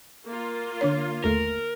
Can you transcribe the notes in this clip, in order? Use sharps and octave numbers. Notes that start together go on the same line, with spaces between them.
A#3 F4
D3 D4 C#5
G1 D#2 A3 A#4